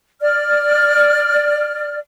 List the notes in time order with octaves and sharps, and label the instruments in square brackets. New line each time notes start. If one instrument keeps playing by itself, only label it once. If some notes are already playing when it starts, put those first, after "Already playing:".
[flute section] D5 F6